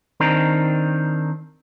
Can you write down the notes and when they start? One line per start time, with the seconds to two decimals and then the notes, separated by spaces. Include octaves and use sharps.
0.20 D#3 C4 D4 D#4 A#4